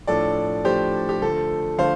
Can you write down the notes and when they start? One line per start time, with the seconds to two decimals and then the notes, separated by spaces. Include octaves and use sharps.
0.07 A2 F3 D4 A4 D5
0.65 A2 F3 D4 G4 C5
1.09 G4
1.22 D3 F3 A3 A4
1.78 D3 F3 A3 C5 F5